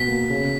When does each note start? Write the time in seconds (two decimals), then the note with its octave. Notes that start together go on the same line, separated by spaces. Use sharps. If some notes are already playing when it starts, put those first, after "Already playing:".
Already playing: B2 B6
0.08 A#3
0.30 C#3